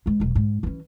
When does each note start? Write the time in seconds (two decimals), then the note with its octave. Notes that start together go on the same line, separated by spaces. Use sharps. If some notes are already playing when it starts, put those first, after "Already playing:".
0.06 E3 G#3
0.20 E1 B1
0.35 G#2
0.63 E3 C#4